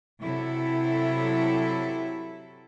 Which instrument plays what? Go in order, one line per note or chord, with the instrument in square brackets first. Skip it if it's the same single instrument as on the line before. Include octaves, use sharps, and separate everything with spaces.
[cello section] C3 F#3 E4 A4